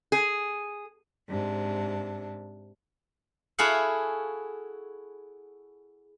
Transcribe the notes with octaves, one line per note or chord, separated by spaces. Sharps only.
G#4
G#2 C3 D4
E4 F#4 G#4 A4 F5 F#5